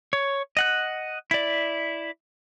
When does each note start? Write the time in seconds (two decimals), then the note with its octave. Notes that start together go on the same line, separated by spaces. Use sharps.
0.13 C#5
0.57 D#5 F#5 F#6
1.31 E4 D5